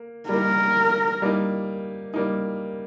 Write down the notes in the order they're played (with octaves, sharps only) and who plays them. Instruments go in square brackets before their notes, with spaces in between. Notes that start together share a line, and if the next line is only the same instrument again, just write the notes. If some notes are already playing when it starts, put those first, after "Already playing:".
Already playing: [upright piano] A#3
[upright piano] G3 A#3 D#4 [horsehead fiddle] A#4
[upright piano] G3 A#3 D#4
G3 A#3 D#4